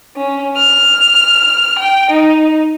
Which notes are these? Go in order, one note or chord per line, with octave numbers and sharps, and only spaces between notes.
C#4
F6
G5
D#4